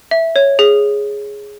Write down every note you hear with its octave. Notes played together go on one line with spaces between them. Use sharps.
E5
C#5
G#4